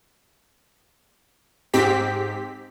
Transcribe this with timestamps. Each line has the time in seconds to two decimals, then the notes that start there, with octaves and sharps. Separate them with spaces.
1.74 G#2 C4 G4 B6